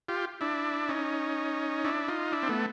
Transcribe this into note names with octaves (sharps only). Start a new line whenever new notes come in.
F4 G4
D4 E4
C#4 D#4
D4 E4
D#4 F4
D4 E4
C4
A3 B3